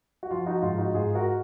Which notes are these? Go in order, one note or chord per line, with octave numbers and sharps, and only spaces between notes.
F#4
F3 F4
D#4 F#4
G#2 F4
D#4 F#4
G#2 F4 G#4
F#4 A#4